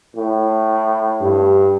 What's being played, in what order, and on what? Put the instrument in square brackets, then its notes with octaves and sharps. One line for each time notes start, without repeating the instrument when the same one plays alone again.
[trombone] A2
[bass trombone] G2